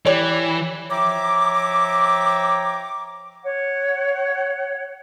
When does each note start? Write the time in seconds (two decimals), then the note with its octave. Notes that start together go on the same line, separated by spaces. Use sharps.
0.06 E3 G4 C#5 D5
0.90 F3 C#5 E5 G5 A#5 D6
3.44 C#5 F#5